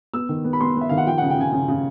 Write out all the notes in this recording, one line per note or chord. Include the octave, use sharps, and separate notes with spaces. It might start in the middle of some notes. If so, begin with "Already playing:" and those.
B3 E6
D#3
B3
B5
B3 C6
B3
E5
D#3 F5
F#5
F3 G5
C#3 F#5
G5
C#3 G#5
C#3
C#3